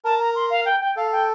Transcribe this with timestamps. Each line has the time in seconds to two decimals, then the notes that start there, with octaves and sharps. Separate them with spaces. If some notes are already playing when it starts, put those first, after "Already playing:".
0.04 A#4 A5
0.20 A#5
0.35 C6
0.50 F5
0.66 G5
0.81 G5
0.96 A4 F5
1.12 G5